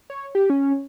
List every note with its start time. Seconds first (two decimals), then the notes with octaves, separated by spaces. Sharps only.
0.10 C#5
0.35 G4
0.50 C#4